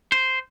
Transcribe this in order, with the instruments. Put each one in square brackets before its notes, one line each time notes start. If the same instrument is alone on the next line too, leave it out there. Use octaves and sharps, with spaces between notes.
[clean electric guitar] C5